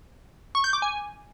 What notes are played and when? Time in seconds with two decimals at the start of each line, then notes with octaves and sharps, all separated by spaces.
0.55 C#6
0.64 G6
0.73 D6
0.82 G#5